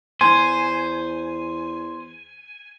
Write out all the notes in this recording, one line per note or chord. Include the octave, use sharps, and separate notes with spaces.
E2 C5 G#5 C6